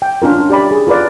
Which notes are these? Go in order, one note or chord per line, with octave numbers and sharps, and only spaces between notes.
G5
C#4 D4 F4 A#4
G4 D5 B5
G#4
F4 A#4 B4 D5